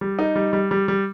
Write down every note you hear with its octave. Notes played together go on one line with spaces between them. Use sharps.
G3
D#4
G3
G3
G3
G3